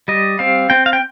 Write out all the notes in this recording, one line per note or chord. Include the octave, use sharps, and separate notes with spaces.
G3 D#5
C4 F5
C4 G5
F5
G5